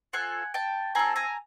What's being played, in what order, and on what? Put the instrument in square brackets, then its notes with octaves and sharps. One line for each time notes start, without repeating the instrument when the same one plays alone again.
[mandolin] C4 F4 A4 F#5 G#5
G5 A5
C4 F4 A4 G#5 A#5
G#5 A#5